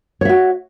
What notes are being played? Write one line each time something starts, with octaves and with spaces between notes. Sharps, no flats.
F#4 C#5 E5